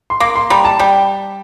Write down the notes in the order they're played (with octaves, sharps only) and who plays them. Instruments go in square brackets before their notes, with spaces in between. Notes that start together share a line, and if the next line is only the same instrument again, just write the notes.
[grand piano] C6
[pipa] A#3 [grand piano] D6
[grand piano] C6
[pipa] G3 [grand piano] A#5
[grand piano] A5
[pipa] G3 [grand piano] G5